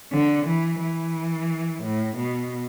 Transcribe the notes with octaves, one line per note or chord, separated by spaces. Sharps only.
D3
E3
E3
A2
B2